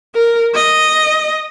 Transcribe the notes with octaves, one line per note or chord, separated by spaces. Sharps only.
A#4
D#5